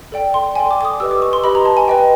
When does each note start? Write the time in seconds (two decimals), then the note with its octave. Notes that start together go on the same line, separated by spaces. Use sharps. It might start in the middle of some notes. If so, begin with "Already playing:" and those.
0.12 A4 D5 G5
0.34 C6
0.55 A4 D5 G5 G#5
0.71 D6
0.81 D6
0.85 D#6
1.00 G4 B4 D#5 E6
1.11 D6
1.22 C#6
1.33 C6
1.44 G4 B4 D#5 B5
1.55 A#5
1.66 A5
1.77 G#5
1.88 B4 D#5 G5